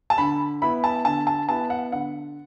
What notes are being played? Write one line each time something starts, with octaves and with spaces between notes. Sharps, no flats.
A5
D3 B5
B3 E4 B5
A5
D3 A5
A5
B3 E4 A5
F#5
D3 F#5